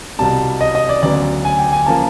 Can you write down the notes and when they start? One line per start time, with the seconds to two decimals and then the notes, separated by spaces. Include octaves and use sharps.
0.19 C2 B2 G3 A5
0.61 D#5
0.75 D#5
0.89 D5
1.02 D2 C#3 F#3 B3 D5
1.45 G#5
1.59 G5
1.72 G#5
1.86 C#3 F3 A#3 A5